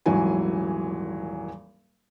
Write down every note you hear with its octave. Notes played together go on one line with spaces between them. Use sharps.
D#1 G#1 E3 F#3 G#5